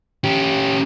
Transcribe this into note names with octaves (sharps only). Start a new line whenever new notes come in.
C#4 G4